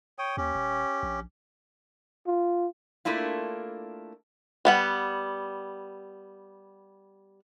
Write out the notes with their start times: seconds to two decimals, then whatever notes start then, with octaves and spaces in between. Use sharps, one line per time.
0.19 C#5 G5 D#6
0.37 D#2 C#4 G4
0.55 D#1
1.03 A#1
2.27 F4
3.05 A3 A#3 D4 E4 F4
4.65 G3 B3 F#5